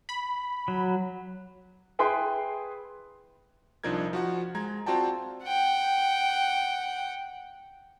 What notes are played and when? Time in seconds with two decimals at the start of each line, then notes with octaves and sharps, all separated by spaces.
0.09 B5
0.68 F#3
1.99 E4 G#4 B4 G5 G#5 C6
3.84 C2 F3 D4 D#4 A#4 G#6
4.13 F3 F#4 F#5
4.55 G#3 A#5 G#6
4.86 C4 F4 F#4 D5 G5 A5
5.45 F#5 G5